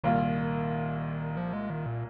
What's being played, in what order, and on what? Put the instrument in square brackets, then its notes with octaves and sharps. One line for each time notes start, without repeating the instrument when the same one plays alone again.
[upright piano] C2 A#2 A#3 F4 [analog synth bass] D#3
[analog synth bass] F3
G#3
D#3
A#2